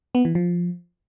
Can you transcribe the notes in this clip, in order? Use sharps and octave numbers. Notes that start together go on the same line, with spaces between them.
B3
E3
F3